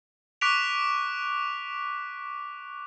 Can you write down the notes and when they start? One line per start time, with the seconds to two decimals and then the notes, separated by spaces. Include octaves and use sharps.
0.41 C#6 D6 F#6 B6 D7 F7